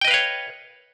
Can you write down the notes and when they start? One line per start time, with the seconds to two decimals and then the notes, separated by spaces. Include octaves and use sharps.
0.01 G5
0.05 D#5
0.08 B4
0.11 F5
0.14 C#5